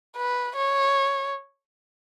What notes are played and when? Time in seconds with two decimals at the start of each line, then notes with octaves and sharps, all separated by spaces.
0.16 B4
0.56 C#5